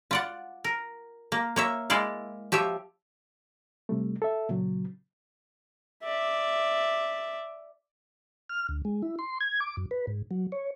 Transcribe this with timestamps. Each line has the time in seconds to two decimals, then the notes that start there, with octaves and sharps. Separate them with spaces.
0.11 F4 D5 F#5
0.64 A#4
1.32 A#3
1.56 A#3 C#5 E5
1.90 G#3 E4 D5 F5
2.52 F3 G4 C#5 E5
3.89 C3 G3 A3
4.22 A4 E5
4.49 A#2 C#3 F#3
6.04 D5 E5
8.49 F6
8.69 D2
8.85 G#3
9.02 E4
9.19 C6
9.40 G#6
9.60 D6
9.77 F#2
9.91 B4
10.07 G#2
10.31 F#3
10.52 C#5